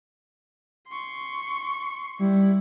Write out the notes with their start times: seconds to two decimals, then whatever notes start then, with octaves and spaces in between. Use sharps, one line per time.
0.88 C6 C#6
2.19 G3 E4